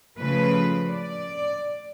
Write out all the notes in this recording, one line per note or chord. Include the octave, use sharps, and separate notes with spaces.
C#3 F3 A3 B4
D5